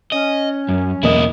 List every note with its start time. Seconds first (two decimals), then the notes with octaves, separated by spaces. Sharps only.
0.12 C#4 D#5
0.69 F#2
1.03 B1 E2 A#3 E4 D#5